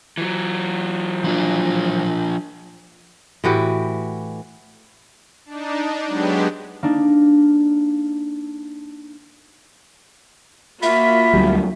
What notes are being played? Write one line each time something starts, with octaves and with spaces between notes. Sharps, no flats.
E3 F#3
F3 D4 F4
A2 E3 F#4 G4
D4 D#4
F#3 G#3 B3 D4 G4
A#3 D4 D#4
A#3 F4 F#4 E5 B5
D2 F#3 G3